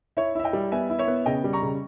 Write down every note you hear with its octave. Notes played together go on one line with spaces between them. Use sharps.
E4 C#5 E5
E4 E5
D#5 G5
G3
B3 E5 G#5
E4
C#5 E5
B3
C#3 D#5 G5
G3
A#5 C#6
C#3